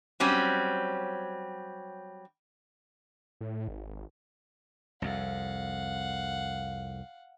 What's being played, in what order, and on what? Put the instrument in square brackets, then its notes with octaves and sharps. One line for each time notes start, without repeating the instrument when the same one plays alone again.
[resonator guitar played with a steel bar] F#3 G3 C4 C#4
[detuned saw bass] A2
G#1
[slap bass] C2 F2 [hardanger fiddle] F5 F#5